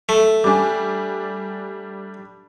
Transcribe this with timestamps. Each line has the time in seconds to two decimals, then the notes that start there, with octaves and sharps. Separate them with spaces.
0.09 A3
0.44 G3 D4 G#5 D6